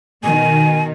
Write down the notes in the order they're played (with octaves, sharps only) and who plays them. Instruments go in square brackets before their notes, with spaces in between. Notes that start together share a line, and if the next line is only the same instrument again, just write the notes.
[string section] B2 D#3 [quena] G#5